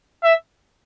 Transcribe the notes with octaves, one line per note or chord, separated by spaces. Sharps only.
E5